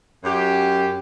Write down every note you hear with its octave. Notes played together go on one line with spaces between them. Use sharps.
F#2 G4